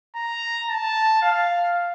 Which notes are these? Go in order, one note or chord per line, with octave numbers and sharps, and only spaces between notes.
A#5
A5
F5